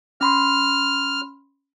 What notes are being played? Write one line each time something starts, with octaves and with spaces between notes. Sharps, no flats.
C#4 B5 C6 F6